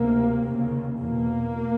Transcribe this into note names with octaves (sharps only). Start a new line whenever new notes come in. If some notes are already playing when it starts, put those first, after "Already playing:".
Already playing: D2 C3 A#3
D#2 C#3
E2 B2 A#3